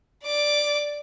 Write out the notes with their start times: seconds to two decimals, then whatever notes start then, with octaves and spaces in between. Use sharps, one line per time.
0.25 D5 D6